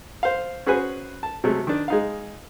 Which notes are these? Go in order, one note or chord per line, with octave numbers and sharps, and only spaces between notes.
C5 F5
C#4 F#4 G#4 B4 C5 G#5
A5
C3 F#3 G#3 A3
D#3 D4
G#3 D#4 F5